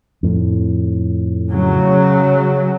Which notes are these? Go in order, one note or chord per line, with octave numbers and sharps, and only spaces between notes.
F2 A2
C#3 F#3